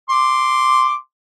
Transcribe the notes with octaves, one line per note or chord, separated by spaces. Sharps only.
C6 D6